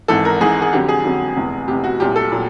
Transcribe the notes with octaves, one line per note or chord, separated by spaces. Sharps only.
G#1 G#2 E3 A4
A#4
G#1 G#2 E3 G#4
G#4
F2 D3 F#3 G4
G#4
F2 D3 F#3
F1 E2 C3
F1 E2 C3 G4
F#4
C2 A#2 F#3 G4
A4
A#2 F#3